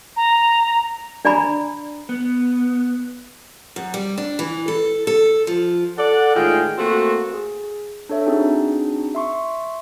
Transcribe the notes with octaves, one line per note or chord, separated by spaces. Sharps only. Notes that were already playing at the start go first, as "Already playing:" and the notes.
A#5
D4 D5 G#5 A#5 B5
B3
F#2
G3
D4
E3
A4
A4
F3
A4 D5 F#5
A2 D#3 G#3 F4 G#4 G5
A3 A#3 C4 F#4
G#4
D4 A4 C#5 E5
C4 D4 D#4 F#4 G#4
E5 C6 C#6